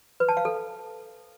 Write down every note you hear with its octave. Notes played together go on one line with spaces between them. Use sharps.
B4
A5
F5
A4